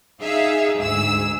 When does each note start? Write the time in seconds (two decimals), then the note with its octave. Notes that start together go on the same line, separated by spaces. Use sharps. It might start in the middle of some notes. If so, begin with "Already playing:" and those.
0.22 D#4 G#4 E5 F5
0.80 D2 G#2 G#4 E6